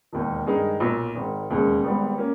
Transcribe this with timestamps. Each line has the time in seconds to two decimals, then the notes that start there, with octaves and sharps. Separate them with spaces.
0.12 E1 D#2 D#3
0.46 G2 D#3 G#3 D#4 G#4
0.80 B1 A#2 A#3
1.15 G#1 G#2 D#3
1.50 E1 D#2 C#3 G#3
1.84 G#1 G#2 G3 B3
2.18 A#3 C#4